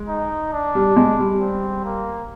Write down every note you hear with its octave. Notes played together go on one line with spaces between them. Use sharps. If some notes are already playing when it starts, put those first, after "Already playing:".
Already playing: G#3
D#4
D4
G3
G#3
G3
C4
A#3